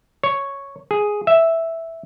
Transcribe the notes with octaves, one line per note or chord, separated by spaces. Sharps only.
C#5
G#4
E5